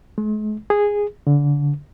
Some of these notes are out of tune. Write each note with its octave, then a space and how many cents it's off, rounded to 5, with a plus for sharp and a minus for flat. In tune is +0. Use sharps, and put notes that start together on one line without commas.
G#3 +45
G#4 -10
D3 -25